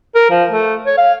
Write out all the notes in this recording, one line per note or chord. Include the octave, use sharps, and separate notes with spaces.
A#4
F3
A3
C#5
F5